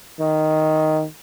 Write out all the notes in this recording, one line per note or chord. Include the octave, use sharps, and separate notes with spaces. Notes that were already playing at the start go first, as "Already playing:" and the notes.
D#3